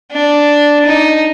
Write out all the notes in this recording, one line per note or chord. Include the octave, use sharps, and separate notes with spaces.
D4
D#4